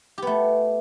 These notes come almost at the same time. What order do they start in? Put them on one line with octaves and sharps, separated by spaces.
G4 B3 A3